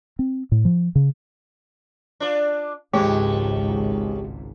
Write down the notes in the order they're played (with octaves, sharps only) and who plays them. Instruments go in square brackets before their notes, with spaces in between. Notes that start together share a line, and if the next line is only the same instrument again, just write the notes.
[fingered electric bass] C4
A2
F3
C#3
[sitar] D4 F4 D5
[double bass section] G#1 C#2 G#2 [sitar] D#3 F3 C#5 [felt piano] G#3 [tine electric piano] G4